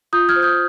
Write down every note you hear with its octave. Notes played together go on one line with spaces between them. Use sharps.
F4 D#6 G6
F6 G#6
C5
D#6 G6